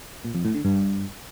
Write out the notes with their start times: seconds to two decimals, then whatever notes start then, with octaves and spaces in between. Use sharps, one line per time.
0.25 A#2
0.35 F2
0.45 A2
0.55 D3
0.65 G2